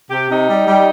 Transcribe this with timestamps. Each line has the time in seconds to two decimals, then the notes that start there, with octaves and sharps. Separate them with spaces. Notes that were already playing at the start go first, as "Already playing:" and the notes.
0.10 C3 G4
0.29 C3 D#4
0.47 G3
0.67 G3